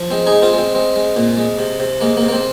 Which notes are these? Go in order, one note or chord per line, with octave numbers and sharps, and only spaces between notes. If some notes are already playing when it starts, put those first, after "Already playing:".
Already playing: F3
G#3 C4
D#4 G#4
G#3
C4 F4
G#3
C4
G#3 C4
G#3
A#2
G#3
C3
C3
G#3 A#3
A#3
C3
A#3
C4